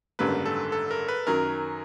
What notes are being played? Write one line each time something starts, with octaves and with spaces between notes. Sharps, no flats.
G#1 F#2 D3 G3 A#3 B4
A4
A4
A#4
B4
F#2 D#3 F#3 A#4